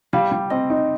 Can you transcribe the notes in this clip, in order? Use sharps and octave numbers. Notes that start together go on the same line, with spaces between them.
G3 F5
G3
C4 D#5
D#4